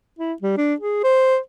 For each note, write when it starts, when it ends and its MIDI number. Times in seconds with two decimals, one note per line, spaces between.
0.19 0.33 64
0.42 0.54 55
0.57 0.74 62
0.80 1.03 68
1.03 1.38 72